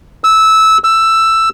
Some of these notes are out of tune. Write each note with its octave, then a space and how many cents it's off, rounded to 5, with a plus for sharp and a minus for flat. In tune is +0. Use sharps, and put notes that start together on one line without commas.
E6 -15
E6 +10